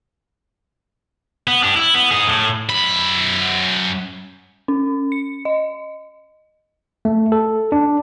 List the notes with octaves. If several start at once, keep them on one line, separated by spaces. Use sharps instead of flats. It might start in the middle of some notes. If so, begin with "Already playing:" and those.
B3
D4 G4
E4
B3
D#4 G#4
A2
F#2 B5
C#4
C#7
D#5
A3
A4
D4